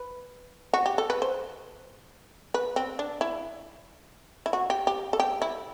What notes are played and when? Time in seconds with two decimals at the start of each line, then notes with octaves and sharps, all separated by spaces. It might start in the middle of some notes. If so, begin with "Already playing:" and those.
Already playing: B4
0.73 F#4
0.86 G4
0.98 A4
1.10 B4
1.22 C5
2.54 B4
2.76 C4
2.99 D4
3.21 E4
4.46 E4
4.53 F#4
4.70 G4
4.87 G4
5.13 A4
5.20 G4
5.42 E4